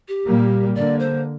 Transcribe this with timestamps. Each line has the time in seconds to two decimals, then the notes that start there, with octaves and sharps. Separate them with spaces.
0.08 G4
0.25 A#2 G3 A#3
0.75 D3 A#3 D5
0.99 C5